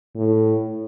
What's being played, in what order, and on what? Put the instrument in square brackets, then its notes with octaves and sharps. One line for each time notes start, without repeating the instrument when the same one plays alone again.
[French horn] A2